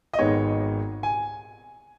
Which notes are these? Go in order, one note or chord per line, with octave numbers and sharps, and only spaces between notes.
D#5
G#1 G#2 D#3 G#3 B3 C#5
G#5